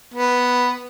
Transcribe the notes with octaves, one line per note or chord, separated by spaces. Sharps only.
B3